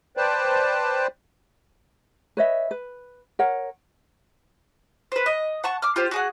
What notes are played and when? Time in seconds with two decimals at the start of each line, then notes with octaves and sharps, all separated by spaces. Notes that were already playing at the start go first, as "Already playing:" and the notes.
0.17 B4 C5 D5 G5 A5
2.37 B4 C#5 D#5 E5
2.71 B4
3.39 A#4 C#5 F#5
5.12 B4 C5
5.26 D#5
5.64 F#5 A5 C#6
5.82 D6 F6
5.96 F4 G4 C5
6.11 F#4 G#4 F#5